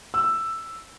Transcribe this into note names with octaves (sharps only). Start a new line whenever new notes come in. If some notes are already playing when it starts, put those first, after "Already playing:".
E6